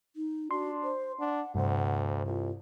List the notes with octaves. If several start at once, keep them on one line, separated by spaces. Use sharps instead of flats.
D#4
D4 F#4 C6
C5
D4 F#5
D2 G2 C3 C5 F#5
C2 F4